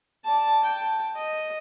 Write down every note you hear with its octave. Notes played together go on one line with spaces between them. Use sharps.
D5 A5
G5 A5
D#5